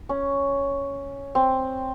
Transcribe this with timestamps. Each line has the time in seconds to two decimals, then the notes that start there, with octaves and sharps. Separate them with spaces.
0.09 C#4
1.35 C4